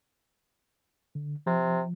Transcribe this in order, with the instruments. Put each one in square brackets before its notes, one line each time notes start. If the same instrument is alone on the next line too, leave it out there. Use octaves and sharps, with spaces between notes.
[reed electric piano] D3
[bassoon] C3 [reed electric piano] F3